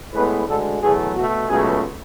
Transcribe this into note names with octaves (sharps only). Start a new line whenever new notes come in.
A2 G#3 B3 B4
D2 D3 G#3 A4
E2 B2 F#3 A3 G#4
B2 A3 F#4
C#2 B2 F#3 A3 G#4